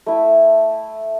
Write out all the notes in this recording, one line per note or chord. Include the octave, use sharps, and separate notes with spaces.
A3 E4